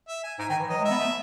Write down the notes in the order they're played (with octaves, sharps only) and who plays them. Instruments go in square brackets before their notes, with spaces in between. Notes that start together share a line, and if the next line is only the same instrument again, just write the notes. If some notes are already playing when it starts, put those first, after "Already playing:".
[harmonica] E5
G#5
[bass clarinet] G#2 [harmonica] G#5
[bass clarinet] D#3 [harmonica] G#5
[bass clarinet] E3
[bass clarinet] F#3 [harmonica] D#5
[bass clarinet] G#3
[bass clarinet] B3 [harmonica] E5
[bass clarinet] A3